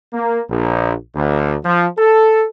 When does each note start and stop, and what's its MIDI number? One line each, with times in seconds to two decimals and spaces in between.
0.13 0.40 58
0.50 0.93 34
1.15 1.55 38
1.65 1.86 53
1.97 2.43 69